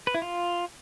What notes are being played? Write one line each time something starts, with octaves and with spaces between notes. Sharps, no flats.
B4
E4
F4